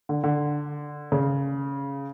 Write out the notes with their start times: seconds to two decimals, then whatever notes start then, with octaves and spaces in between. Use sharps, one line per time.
0.09 D3
0.24 D3
1.12 C#3